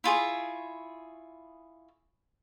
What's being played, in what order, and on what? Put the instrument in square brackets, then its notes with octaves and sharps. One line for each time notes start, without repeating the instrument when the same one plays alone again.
[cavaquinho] E4 F4 G#4 C#5